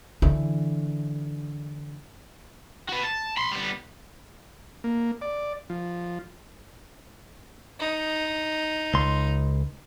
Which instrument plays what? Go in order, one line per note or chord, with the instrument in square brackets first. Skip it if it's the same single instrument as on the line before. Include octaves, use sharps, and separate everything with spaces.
[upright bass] D3 E3
[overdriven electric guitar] F#4 B4
A5
B5 C6
G3 B3
[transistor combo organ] A#3
D5
F3
[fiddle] D#4
[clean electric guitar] C#2 C6